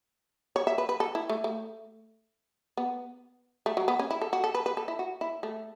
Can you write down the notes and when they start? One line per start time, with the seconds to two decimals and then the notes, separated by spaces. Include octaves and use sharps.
0.56 C#5
0.67 E5
0.78 B4
0.89 B4
1.00 A4
1.15 E4
1.30 A3
1.44 A3
2.77 B3
3.66 A3
3.77 F#3
3.88 B3
3.99 C#4
4.11 E4
4.21 A4
4.33 F#4
4.44 A4
4.54 B4
4.66 B4
4.77 A4
4.88 E4
4.99 F#4
5.21 E4
5.43 A3